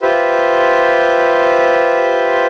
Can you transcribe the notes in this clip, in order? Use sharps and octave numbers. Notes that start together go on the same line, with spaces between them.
F4 G4 B4 C5 E5